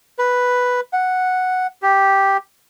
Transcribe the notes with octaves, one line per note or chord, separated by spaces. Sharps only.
B4
F#5
G4